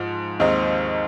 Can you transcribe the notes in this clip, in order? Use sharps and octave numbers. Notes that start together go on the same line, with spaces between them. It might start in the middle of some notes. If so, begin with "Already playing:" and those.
Already playing: G#2 F3
D#2 D#3 G#3 C4 D#4